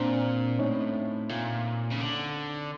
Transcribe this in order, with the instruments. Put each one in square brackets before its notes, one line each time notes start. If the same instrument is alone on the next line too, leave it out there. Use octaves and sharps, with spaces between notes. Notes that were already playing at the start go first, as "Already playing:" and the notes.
Already playing: [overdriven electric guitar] A#2 [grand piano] C4 D4
[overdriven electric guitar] A2 [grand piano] C#4 D#4
[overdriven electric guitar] A#2
C#3
D3